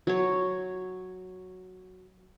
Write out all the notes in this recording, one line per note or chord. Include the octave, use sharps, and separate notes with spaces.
F#3 C#5